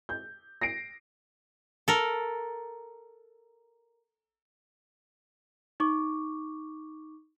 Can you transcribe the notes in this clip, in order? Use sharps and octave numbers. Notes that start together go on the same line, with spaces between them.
G6
A#6 C7 D7
A4 A#4
D#4 C#6 D6